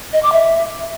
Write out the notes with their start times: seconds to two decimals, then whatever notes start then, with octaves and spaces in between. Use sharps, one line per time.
0.13 D#5
0.22 D6
0.32 E5